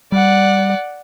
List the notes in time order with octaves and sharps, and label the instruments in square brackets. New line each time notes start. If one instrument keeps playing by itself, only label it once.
[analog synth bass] G3 [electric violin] D5 F#5